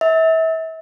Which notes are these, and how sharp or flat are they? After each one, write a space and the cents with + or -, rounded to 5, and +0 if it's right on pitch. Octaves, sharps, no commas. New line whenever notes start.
E5 -35